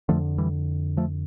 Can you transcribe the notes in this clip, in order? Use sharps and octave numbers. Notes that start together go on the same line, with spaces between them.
F2 D3 F3 A3
E3 G3
F3 A3